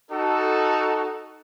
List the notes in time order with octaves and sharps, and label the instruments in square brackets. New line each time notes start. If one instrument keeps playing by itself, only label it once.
[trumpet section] D#4 F#4 A4